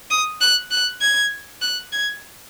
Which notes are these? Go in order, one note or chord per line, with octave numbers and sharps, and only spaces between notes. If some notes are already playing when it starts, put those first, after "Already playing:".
D#6
F#6
F#6
G#6
F#6
G#6